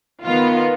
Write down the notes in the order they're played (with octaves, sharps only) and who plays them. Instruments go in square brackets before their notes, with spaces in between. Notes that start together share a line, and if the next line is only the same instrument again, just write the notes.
[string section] D#3 B3 F4